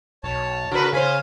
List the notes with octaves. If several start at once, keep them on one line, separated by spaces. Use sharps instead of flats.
B1 C#5 A5
C#3 F#4 A#4 B4
C#3 C#4 B4 C5 F5 G#5